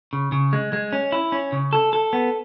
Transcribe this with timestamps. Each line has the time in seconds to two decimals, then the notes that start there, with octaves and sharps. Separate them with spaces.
0.13 C#3
0.32 C#3
0.53 G#3
0.73 G#3
0.93 C#4
1.12 E4
1.32 C#4
1.52 C#3
1.73 A4
1.93 A4
2.13 B3